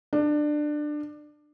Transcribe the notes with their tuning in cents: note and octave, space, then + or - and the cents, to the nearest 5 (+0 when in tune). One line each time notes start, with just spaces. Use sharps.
D4 +20